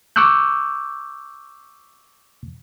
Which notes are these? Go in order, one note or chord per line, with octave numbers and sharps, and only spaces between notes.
C#6 D6 E6 F#6 G6